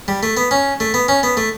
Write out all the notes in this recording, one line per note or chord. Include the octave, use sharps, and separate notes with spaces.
G3
A3
B3
C#4
A3
B3
C#4
B3
A3